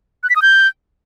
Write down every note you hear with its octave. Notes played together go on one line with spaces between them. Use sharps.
F#6
B6
D#6
G6